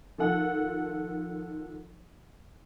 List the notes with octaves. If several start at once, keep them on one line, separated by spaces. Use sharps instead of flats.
D#3 F3 A4 F#5